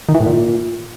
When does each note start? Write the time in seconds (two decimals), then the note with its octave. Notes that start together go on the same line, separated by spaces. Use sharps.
0.09 D#3
0.15 E3
0.20 A2
0.26 A#2